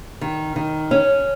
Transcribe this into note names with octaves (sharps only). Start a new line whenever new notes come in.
D#3
D#3
C#4